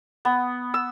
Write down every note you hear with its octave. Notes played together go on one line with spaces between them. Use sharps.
B3
E6